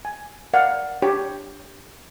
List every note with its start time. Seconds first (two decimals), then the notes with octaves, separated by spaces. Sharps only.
0.05 G#5
0.53 A#4 D5 F5 F#5
1.02 D4 G4 C#5 G5